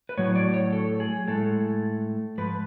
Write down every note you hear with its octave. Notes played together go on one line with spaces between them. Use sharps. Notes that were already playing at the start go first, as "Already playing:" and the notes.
B4
A2 F#3 C#5
D5
C#5
A4
G#4
A2 G#3 A4
G#2 F3 B4